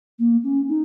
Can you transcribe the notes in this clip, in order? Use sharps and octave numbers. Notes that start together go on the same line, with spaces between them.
A#3
C#4
D#4